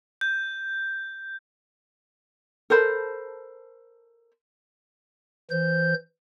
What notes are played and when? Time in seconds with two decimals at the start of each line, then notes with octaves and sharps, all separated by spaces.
0.21 G6
2.70 A4 A#4 C5 B5
5.51 E3 C5 G6